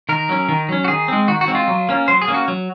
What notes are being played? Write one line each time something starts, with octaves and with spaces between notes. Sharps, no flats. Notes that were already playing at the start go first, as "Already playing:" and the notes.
D#3 A#4
F#3 C#4
D#3
F#3 C#4
F#4
D#3 G#4
G#3 C4
D#3 F#4
F#4
G#3 C4
F4
F#3
A#3 C#4
F#3 C5
G#4
A#3 C#4
F#4
F#3